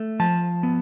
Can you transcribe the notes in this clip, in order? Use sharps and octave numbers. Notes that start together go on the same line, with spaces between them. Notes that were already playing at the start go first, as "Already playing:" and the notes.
Already playing: A3
F3 A5
B3